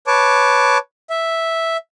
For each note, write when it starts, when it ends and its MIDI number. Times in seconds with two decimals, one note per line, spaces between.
0.07 0.78 71
0.07 0.78 73
0.07 0.78 81
0.07 0.78 86
1.10 1.77 76